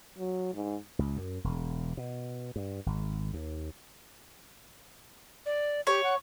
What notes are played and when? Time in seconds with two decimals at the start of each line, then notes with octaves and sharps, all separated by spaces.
0.18 F#3
0.54 G#2
0.99 C#2
1.17 F#2
1.44 E1
1.97 B2
2.56 G2
2.86 G#1
3.34 D#2
5.46 D5
5.87 G4 C#5
6.04 F#5